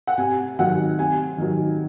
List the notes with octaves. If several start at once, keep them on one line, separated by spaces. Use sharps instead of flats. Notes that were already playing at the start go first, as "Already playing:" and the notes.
F#5
C3 G#5
D#3 F#3 F#5
C3 G#5
D#3 F#3